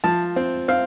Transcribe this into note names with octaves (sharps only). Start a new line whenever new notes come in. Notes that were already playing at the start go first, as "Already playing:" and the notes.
F3 A5
C4
C4 F5